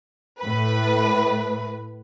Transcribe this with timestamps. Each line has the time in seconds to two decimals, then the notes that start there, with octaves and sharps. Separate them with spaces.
0.40 A2 B4